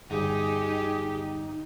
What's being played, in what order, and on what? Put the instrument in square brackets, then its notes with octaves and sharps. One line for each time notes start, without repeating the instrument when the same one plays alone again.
[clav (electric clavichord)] G1 [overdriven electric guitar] D#4 [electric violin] G4 [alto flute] G#4